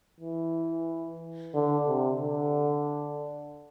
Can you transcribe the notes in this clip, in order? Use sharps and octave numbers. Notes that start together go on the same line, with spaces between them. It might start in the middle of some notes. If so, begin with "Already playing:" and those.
E3
D3
C3
D3